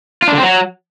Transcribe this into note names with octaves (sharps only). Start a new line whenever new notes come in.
F4
D4
D3
C4
F#3